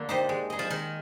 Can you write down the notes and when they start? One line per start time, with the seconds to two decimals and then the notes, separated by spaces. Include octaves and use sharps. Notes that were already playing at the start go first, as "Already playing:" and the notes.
Already playing: D3 A#3
0.09 D#4 G4 C5 D#5
0.29 G#3
0.50 D#4 G#4 D#5
0.59 F3
0.71 D#3 G#3